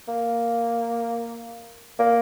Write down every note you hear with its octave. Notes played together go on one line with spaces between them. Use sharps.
A#3
A#3